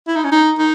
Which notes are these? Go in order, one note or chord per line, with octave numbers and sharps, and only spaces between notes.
E4
D#4
C#4
D#4
D#4